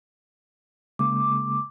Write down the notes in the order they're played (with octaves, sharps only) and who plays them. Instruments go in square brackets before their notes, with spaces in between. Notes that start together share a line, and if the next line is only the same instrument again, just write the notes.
[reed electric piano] C#3 G#3 A#3 [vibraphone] D6